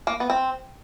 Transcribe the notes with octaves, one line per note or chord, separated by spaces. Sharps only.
A#3
B3
C4